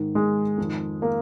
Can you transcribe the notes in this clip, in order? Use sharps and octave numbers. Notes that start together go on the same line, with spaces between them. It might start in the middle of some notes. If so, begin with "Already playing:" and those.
Already playing: G#2 D#3
G#3
F2 D#3
A#3